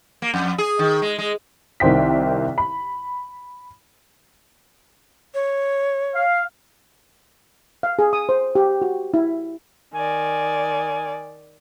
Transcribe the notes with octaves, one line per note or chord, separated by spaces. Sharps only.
A#3
F2
G#4
D#3
G#3
G#3
C2 D#3 C5 G5 B6
B5
C#5
F5
F5
G#4
D#6
C5
G4
F#4
E4
D#3 D5 G#5